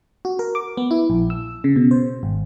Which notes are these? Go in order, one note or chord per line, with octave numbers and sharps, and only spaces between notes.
F#4
A#4
D6
B3
E4
A#1
E6
C#3
B2
C5
G#1